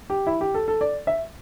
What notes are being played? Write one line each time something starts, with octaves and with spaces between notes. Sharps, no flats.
G4
E4
G4
A4
A4
D5
E5